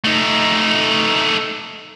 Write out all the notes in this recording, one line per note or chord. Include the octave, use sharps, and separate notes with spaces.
A3 D#4